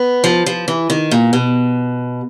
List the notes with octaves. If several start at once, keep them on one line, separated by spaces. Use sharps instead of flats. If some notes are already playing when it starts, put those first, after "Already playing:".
Already playing: B3
F3
F3
E3
D#3
A#2
B2